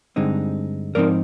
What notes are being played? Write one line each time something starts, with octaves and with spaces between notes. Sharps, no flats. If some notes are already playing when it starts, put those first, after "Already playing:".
G2 D3 G#3 C4 D#4
G#2 F3 C4 D#4 A#4 D5